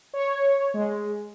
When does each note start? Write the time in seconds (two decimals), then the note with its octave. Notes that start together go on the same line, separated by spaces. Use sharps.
0.14 C#5
0.74 G#3